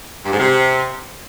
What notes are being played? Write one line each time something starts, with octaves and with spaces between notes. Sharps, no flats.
G2
G#2
C3